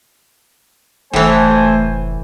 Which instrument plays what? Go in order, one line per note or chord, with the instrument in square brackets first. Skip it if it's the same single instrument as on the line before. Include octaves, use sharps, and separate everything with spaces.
[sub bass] F1 [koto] A2 E3 [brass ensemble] A3 C5 G#5